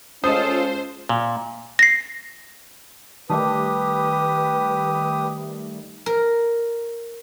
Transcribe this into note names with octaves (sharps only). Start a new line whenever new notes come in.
G#3 C#4 F4 A4 C5 D#5 D#6
A#2
A#6 C7
D#3 G3 A3 G4 B4 A5 D6 D#6
A#4